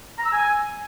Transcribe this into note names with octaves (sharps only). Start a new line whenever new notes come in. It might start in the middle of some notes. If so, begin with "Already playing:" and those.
A#5
E6
G#5